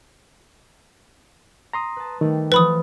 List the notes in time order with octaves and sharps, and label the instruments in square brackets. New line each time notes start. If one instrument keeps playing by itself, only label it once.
[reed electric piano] A#5 C6 D#6
[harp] B4 A5
[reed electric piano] D#3 [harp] G3 A3
[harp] E3 F3 [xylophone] B4 B5 D#6